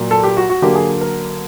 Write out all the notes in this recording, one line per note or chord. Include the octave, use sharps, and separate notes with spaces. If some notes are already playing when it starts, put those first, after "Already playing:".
Already playing: A#2 F#3 A#3
A4
G4
F#4
F#4
D3 F#3 A#3 G4
G#4
A#4